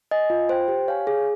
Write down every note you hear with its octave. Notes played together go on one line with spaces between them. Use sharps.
D#5 G#5
F4
C5 G5
G4
C#5 F5 G#5
G#4